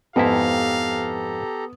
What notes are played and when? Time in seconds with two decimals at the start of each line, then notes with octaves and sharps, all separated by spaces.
0.16 F2 G#2 B3 E4 G4 A4 F5 A#5